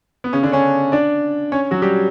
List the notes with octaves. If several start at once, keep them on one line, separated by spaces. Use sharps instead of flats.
B3
C#3 C#4
D3 D4
C#4 C#5
D4 D5
C#4 C#5
F#3 F#4
G3 G4